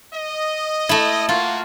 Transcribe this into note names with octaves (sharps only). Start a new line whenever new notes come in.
D#5
A3 E4
A#3 F4 F#4